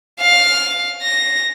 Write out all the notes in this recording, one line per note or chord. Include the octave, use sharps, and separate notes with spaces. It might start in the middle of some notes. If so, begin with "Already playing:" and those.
F5
A#6